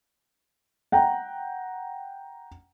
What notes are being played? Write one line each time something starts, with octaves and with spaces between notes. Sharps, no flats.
F#5 G5 A#5